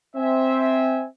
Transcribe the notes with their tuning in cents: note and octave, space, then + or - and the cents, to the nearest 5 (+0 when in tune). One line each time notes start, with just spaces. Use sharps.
C4 +0 E5 -15 G#5 +0